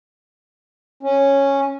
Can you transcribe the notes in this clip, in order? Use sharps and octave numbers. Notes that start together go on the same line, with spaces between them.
C#4